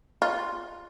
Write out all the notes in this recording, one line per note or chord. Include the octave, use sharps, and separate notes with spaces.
F4